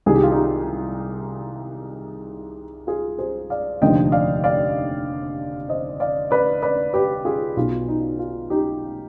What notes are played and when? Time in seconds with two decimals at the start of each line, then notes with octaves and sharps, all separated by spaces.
0.06 C2 C3 D#3 G#4
0.14 G4
0.23 F4
0.31 D#4 G4
2.87 F4 G#4
3.19 G#4 C5
3.50 D5 F5
3.82 F1 D#2 D3 F3 D#5 G5
4.12 D5 F5
4.44 D5 F5
5.69 C5 D#5
6.00 D5 F5
6.31 B4 D5
6.62 B4 D5
6.94 G4 B4
7.25 F4 G#4
7.56 B1 B2 F4
7.88 D#4
8.19 F4
8.50 D#4 G4